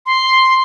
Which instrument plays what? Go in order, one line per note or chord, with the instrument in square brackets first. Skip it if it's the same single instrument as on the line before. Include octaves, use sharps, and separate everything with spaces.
[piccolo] C6